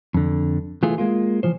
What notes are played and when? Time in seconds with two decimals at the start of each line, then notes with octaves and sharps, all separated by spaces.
0.14 F2 D3
0.83 E3 A3 F4 G#4
0.98 G#3 A#3 F4
1.43 E3 F3 C5